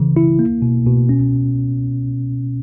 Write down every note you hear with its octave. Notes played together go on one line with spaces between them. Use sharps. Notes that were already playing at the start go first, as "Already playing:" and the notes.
Already playing: C#3 E3
E4
A#3
B2
B2
C#4